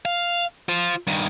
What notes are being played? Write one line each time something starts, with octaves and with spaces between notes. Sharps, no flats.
F5
F4 C5
G2 D#3